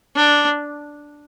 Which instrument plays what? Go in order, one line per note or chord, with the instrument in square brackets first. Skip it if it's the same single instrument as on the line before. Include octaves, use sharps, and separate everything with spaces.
[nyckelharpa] D4